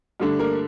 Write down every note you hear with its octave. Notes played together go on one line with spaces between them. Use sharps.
G2 D3 A3 D4
A#3 A#4